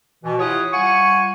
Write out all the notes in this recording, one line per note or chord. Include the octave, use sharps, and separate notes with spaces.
B2 E3
E4 F4 G4 C#5 F#5 D#6
G3 F4 F#5 G#5 C#6